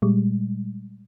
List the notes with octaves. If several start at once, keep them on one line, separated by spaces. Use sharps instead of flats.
A#2 G3 G#3